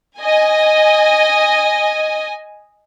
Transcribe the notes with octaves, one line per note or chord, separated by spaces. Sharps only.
D#5 G#5